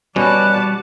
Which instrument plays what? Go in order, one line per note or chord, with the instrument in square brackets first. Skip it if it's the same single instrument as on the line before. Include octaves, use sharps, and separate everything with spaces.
[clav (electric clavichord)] B2 C#4 [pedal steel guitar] G3 F#4 [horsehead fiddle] D5 A5 [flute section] B5 F#6